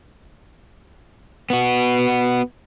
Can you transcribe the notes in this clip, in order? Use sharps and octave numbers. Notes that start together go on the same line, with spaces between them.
B3 F#4